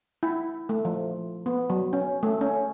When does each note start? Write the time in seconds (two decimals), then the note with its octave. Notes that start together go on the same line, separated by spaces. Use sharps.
0.23 E4
0.69 A3
0.85 F3
1.46 B3
1.70 F#3
1.93 C#4
2.23 A3
2.41 C#4